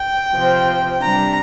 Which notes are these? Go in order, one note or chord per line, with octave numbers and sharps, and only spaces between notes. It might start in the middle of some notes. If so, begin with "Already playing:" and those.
Already playing: G5
C3 F3 C4
C3 G3 D4 A#5